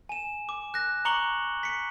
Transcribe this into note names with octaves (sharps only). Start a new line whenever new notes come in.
G#5 E7
D6
F#6 A#6
A#5 C#6 D6 C#7 F#7 G7
B6 C#7